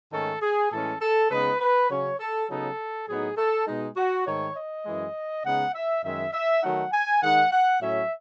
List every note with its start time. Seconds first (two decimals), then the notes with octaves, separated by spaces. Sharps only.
0.13 G#2 D#3 A3 C#4 A4
0.42 G#4
0.71 A2 E3 G#3 C#4 A4
1.01 A4
1.30 C#3 G#3 B3 D#4 B4
1.61 B4
1.90 C#3 F#3 C#4 C#5
2.20 A4
2.49 C#3 F#3 B3 D#4 A4
3.08 A2 F#3 B3 D#4 G#4
3.37 A4
3.67 B2 G#3 D#4
3.97 F#4
4.27 G#2 D#3 A3 C#5
4.56 D#5
4.86 F#2 E3 G#3
5.45 C#3 G#3 B3 D#4 F#5
5.74 E5
6.04 F#2 D#3 G#3 E5
6.33 E5
6.63 D#3 F#3 A3 D#4 F#5
6.92 G#5
7.22 D#3 G#3 D#4 F#5
7.52 F#5
7.81 A2 F#3 C#4 E5